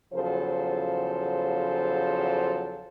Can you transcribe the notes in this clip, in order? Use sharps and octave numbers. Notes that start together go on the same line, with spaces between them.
E2 C#3 F3 F#3 A4 C5